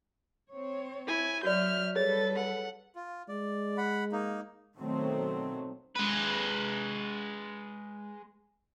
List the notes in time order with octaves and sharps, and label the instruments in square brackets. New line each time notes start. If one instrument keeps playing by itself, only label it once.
[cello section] C4 C#5
[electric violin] E4 G#5
[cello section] F#3 E5 [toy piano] F#4 D5 [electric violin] F6 G6
[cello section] G3 A4 B4 [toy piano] G#4 C#5 [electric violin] A6
[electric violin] F#5
[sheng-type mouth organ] F4
[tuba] G#3 [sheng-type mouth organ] D5
[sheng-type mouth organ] F#5 B5
A#3 D#4
[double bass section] B2 D#3 F#3 A3 C4
[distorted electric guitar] G#3 B4